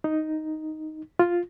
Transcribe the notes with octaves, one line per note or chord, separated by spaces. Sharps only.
D#4
F4